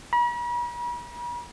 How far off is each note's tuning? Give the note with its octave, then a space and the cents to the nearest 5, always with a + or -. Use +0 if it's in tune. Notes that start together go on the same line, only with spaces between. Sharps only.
B5 -45